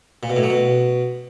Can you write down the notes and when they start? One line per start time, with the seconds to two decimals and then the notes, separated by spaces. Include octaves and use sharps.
0.23 A#2
0.30 B2
0.37 A2
0.43 F#3
0.50 B2